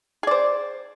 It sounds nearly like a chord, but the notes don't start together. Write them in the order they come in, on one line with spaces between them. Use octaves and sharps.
G#4 D5 C5